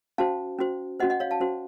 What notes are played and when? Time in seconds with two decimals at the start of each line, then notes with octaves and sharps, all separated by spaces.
0.18 C#4 F#4 C5 F5 A5
0.59 C#4 F#4 C5
0.99 C#4 F#4 C5 D#5 F#5
1.10 D#5 F#5
1.20 C#5 F5
1.31 F5 A5
1.41 C#4 F#4 C5